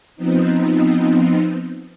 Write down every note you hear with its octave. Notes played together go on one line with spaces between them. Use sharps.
F3 B3 C4 D#4